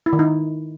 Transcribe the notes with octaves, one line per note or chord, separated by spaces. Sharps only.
E4
D#3
D#4